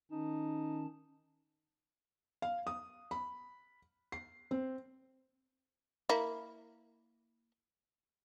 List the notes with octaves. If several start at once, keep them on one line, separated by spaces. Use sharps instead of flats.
D#3 C#4 D#4 A5
F5
D#6
B5
C7
C4
A#3 E4